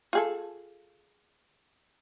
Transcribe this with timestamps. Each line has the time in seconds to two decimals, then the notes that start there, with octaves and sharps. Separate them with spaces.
0.13 F4 G#4 A4